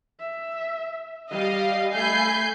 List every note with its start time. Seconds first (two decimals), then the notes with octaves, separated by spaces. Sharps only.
0.19 E5
1.31 G3 D#5 F5
1.94 A3 G#5 B5 G6 C7